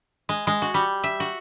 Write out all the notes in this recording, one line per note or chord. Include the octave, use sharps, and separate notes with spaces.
G#3
G#3
F#4
G3
E5
F#4